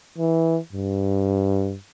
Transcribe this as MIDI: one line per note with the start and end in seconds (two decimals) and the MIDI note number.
0.18 0.58 52
0.73 1.75 43